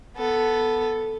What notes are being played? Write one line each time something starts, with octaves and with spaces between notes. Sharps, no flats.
B3 A4